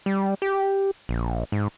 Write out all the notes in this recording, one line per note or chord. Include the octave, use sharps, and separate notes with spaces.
G3
G4
A#1
G#2